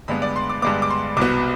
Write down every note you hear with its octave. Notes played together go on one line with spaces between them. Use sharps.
G2 D3 G#3 B3 B5
D5
C6
D6
G2 D3 G#3 B3 D6
D6
C6
C2 B2 B3 D6